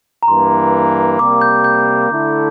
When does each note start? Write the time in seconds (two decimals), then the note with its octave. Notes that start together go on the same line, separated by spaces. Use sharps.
0.23 A#5
0.28 G2 E3 A#3 C6
1.19 C3 G3 A#3 D6
1.41 G6
1.64 G6
2.10 D3 A3 E4 A4